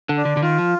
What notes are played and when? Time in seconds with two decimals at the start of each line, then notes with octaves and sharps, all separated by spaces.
0.09 D3
0.17 D4
0.25 D3
0.37 D3
0.42 D#3 F4
0.58 F3